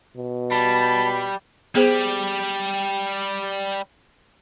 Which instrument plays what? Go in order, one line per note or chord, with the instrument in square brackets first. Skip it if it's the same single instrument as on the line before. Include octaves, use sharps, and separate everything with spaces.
[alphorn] B2
[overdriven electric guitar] G3 [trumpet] A5 [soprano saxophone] B5
[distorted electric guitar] G3 [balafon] B3 G#4 C5